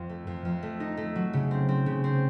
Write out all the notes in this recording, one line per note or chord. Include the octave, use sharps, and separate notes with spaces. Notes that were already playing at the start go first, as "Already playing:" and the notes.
Already playing: F2
A3
F2
F2
A3
D#4
A3
F#3
C#3
C4
C4
C#3
C4